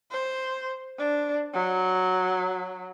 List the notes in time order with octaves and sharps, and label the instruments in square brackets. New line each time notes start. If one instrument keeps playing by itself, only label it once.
[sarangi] C5
D4
F#3